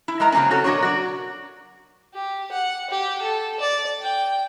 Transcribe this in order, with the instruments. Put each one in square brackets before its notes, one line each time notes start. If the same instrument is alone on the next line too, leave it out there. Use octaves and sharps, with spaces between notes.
[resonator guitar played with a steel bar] E4
G#3 A#4 A#5
C#3 F#3 A#3 C4 C#4
C#4 F#4 A4 C#5
B2 F#3 D4 A#4 C#5
F#4 D5
[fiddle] G4
F#5
G4
A4
D5
G5